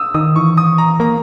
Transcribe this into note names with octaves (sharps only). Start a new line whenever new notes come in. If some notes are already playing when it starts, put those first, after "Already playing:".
Already playing: D#6 E6
D#3 D#6
E3 C#6
D#6
A#5
A#3 A#5